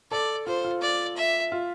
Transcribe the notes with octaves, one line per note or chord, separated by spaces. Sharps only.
A4 D5
F4 C5
F4
D5
E5
F4